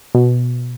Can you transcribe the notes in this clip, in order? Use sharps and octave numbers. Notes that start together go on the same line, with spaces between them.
B2